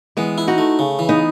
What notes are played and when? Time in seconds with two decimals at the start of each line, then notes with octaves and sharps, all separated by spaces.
0.17 E3 G#3 B3
0.38 E4
0.47 D#4 F#4
0.58 A3
0.79 C#3
0.99 E3
1.09 B3 D#4